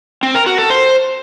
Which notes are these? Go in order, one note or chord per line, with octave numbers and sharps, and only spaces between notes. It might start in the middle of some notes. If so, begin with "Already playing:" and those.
C4
A#4
F#4
A4
C5